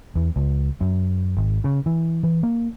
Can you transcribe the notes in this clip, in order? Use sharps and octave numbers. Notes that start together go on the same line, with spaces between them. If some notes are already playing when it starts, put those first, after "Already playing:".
E2
C#2
F#2
G#1
C#3
E3
E3
A#3